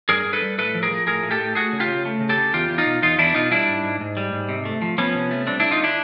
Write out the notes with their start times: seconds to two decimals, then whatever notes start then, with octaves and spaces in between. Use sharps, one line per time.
0.09 G2 G#4 A#4
0.25 G2
0.33 A4 B4
0.42 G3
0.58 A2 A4 B4
0.74 F3
0.83 G#4 A#4
0.90 F3
1.07 A2 G#4 A#4
1.23 A2
1.31 G4 A4
1.39 A2
1.55 A3 F#4 G#4
1.73 C#3
1.80 F4 G4
1.88 C#3
2.05 A3
2.21 C#3
2.29 G4 A4
2.37 C#3
2.53 E2 F4 G4
2.70 E2
2.78 D#4 F4
2.86 B2
3.02 E2 D#4 F4
3.18 E2 D4 E4
3.35 B2 D#4 F4
3.51 G3 D4 E4
3.68 G#2
3.84 G#2
4.01 G#2
4.17 G3
4.32 G#2
4.49 C3
4.65 A3
4.82 F3
4.98 F3 B3 C#4
5.15 C3
5.31 A3
5.47 G3 C4 D4
5.60 D3 D4 E4
5.71 D#4 F4
5.83 D4 E4